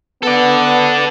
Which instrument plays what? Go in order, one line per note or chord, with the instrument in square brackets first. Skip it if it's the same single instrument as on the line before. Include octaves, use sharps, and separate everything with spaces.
[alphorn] B3 [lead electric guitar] A4 D5